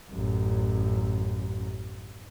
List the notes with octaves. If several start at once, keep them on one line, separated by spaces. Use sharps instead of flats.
A1 F#2